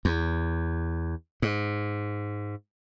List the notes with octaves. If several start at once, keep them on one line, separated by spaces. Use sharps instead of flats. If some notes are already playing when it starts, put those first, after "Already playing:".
E2
G#2